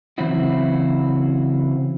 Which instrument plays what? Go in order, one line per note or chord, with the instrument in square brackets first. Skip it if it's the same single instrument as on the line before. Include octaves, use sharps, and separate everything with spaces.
[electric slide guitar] C#3 E3 F#3 C4 E4 F#4